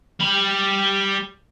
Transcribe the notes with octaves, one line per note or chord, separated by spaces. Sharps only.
G3 B5